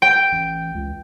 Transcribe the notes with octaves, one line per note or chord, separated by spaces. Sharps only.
G5
A1
C#2